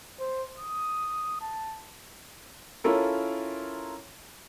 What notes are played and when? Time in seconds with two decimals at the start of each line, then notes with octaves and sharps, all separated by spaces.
0.20 C5
0.59 D#6
1.42 A5
2.84 C#4 E4 F4 A4 A#4